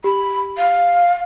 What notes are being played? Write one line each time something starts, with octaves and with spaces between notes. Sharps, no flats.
G4 B5
F5